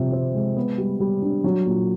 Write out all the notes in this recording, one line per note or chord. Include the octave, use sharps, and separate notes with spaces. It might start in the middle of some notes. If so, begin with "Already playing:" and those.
Already playing: C3 F3
C4
G#3
B3
G3
G3
D4
F#3
A#2